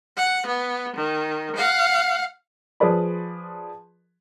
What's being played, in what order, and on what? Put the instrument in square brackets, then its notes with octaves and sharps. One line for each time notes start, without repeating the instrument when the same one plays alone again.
[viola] F#5
B3
D#3
F5 F#5
[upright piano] F3 G#4 B4 D5 B5